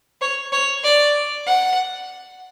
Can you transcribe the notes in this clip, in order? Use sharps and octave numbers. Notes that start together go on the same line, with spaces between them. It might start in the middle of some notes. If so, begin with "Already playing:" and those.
C#5
C#5
D5
F#5